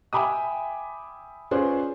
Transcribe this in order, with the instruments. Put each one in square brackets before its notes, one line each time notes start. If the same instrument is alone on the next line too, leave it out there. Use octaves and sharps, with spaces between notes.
[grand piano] E5 G5 G#5 B5 D6 D#6
C#4 F4 G#4 B4 C5 D5